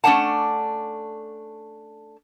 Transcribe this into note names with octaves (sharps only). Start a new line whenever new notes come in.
A3 C#4 D4 F#5 A5